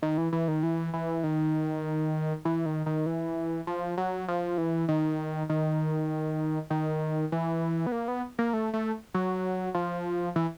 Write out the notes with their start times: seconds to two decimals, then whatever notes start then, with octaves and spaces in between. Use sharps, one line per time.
0.02 D#3
0.18 E3
0.32 E3
0.48 D#3
0.63 E3
0.93 E3
1.24 D#3
2.45 E3
2.66 D#3
2.86 D#3
3.06 E3
3.67 F3
3.97 F#3
4.28 F3
4.58 E3
4.88 D#3
5.49 D#3
6.70 D#3
7.32 E3
7.87 B3
7.92 A#3
8.08 B3
8.39 A#3
8.53 A3
8.73 A3
9.14 F#3
9.74 F3
10.36 E3